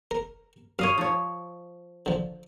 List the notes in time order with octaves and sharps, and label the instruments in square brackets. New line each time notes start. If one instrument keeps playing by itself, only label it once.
[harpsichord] A#4
[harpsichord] F#2 [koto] C#5 D#5 F5
[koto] F3 C#5
[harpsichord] D3 F3